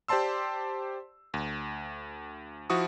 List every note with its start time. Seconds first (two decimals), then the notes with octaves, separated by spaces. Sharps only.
0.08 G4 C5 D5 A5 C6 E6
1.34 D2
2.70 F3 E4 F#4 C#6 D#6